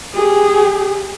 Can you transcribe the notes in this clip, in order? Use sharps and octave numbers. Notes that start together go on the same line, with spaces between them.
G4 G#4